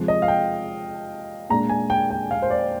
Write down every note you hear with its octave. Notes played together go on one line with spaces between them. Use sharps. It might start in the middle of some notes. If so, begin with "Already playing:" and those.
Already playing: C3 F3 G#3
D#5
F5
G5
A#2 G#3 D4 A#5
G#5
G5
G5
F5
C5
D5